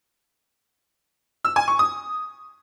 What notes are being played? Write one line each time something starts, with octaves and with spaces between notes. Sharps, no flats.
E6
G#5
C#6
D#6